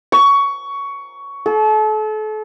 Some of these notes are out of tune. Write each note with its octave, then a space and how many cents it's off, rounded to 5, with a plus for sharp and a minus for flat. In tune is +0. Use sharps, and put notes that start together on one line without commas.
C#6 +15
A4 -35